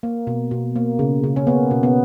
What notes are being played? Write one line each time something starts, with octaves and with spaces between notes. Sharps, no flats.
A#3
B2
B2
A#3
C#3
C#3
C#4
A#3 B3
B2
B3